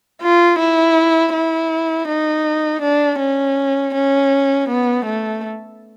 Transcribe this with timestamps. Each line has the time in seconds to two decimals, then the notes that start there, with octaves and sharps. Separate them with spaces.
0.22 F4
0.59 E4
1.34 E4
2.08 D#4
2.82 D4
3.19 C#4
3.95 C#4
4.69 B3
5.06 A3